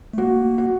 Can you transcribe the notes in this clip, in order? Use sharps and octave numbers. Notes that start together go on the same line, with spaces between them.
A3
A#3 F#4
F#4